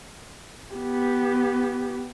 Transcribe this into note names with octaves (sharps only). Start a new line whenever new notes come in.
B3 G4